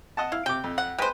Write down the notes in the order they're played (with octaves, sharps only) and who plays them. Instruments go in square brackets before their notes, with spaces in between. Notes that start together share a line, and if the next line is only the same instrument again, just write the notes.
[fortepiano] D#5 F#5 A5
[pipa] E4 [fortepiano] F5
[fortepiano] C3 D6 [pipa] G5
[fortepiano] F2
[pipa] F#5
[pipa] G#3 C5 [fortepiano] B4 G5